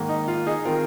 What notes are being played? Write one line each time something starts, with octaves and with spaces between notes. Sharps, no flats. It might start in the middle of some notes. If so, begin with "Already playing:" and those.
Already playing: G#2 D#3 A#3
D#4
F4
D#4 G#4
D#3 C4 F4 A#4